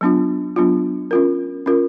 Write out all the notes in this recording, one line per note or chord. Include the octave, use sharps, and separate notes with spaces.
F#3 B3 D4 F4
F#3 B3 D4 F4
C#4 F4 A#4
C#4 F4 A#4